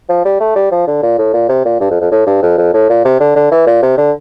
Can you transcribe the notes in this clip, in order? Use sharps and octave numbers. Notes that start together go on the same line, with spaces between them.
F3
G3
A3
G3
F3
D3
A#2
A2
A#2
C3
A#2
G2
F2
F2
A2
G2
F2
F2
A2
A#2
C3
D3
D3
E3
A#2
C3
D3